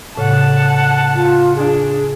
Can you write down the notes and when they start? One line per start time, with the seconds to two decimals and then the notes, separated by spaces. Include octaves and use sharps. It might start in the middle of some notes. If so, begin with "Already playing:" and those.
0.17 A2 C#3 F#5 A5
1.15 F4
1.56 D4 G#4